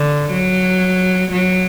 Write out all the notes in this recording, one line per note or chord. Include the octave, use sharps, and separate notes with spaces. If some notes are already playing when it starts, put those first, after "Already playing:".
Already playing: D3
F#3
F#3